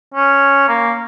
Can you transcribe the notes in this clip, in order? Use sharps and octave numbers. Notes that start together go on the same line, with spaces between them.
C#4
A#3